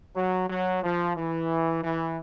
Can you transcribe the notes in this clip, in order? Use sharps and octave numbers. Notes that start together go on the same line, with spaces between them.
F#3
F#3
F3
E3
E3